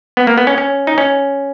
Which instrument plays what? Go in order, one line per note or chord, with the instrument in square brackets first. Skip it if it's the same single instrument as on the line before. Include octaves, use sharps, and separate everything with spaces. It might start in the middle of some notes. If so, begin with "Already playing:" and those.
[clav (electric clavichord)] B3
A#3
B3
C#4
C#4
D#4
C#4